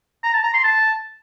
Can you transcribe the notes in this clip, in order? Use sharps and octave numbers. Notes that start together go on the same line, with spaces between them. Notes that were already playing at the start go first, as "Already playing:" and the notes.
A#5
A5
A#5
C6
A5